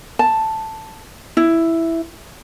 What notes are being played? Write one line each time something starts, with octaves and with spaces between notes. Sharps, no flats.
A5
E4